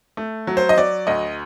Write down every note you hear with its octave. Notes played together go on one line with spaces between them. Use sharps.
A3
F#3
C5
D#5
F#3 D5
D2 D#5